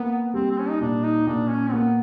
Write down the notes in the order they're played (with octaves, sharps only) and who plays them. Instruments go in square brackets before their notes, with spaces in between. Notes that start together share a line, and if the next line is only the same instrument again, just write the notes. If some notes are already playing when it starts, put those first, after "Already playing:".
Already playing: [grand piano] A#3 [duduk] B3
[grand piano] G3 [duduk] C4
[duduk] C4
C#4
D#4
[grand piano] A#2 [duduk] D4
[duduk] D#4
[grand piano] A#2 [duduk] D4
[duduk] C#4
C4
[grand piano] A#3 [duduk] B3